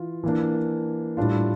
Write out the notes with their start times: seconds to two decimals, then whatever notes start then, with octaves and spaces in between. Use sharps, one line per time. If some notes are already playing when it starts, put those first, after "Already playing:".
Already playing: E3 F4
0.23 E3 A#3 D4
1.17 A2 G3 D4 F4